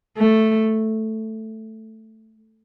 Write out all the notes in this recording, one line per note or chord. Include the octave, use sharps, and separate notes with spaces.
A3